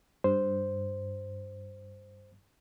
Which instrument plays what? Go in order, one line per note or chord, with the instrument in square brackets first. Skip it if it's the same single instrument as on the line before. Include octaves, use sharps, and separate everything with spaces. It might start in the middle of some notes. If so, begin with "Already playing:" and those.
[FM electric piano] G2 [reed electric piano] C5